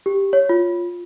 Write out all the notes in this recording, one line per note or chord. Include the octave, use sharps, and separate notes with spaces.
G4
C#5
F4